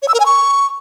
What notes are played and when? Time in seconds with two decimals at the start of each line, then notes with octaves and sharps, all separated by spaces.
0.02 C#5
0.08 E6
0.14 A#4
0.20 G#5
0.26 C#6